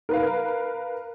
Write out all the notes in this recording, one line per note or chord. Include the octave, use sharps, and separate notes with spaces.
A#4 B4 F5